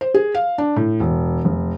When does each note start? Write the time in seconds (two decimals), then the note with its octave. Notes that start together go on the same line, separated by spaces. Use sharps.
0.01 C5
0.14 G#4
0.34 F5
0.58 D4
0.76 A2
1.00 E1
1.45 F1